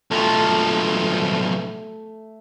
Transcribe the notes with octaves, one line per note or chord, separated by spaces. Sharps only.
B1 F3 A3